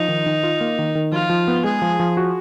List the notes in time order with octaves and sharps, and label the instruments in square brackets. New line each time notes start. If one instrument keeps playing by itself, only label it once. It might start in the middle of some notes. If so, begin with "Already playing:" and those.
Already playing: [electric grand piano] F3 [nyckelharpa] D#4
[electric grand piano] D#3
D#3
F4
A#3
D#3
D#3
[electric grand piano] F3 [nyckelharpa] F4
[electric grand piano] F3
B3
[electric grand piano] G#3 [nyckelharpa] G#4
[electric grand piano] F3
F3
F#4